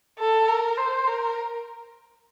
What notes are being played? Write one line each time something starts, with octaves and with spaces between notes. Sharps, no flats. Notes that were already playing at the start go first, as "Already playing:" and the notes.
A4
A#4
C5
A#4